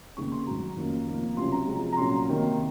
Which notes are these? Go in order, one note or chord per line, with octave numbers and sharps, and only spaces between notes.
D#2 C#3 G#3 C4 D#4 C#6
C6
G#2 D#3 F#3 A#5
F2 D#3 A#3 C#4
C3 F3 A#3 D#4
C#2 C3 F#3 C#4 C6
A#5
C3 F3 G#3
A#5
A#2 F#3 A#3 C#4 C6
C3 D#3 A#3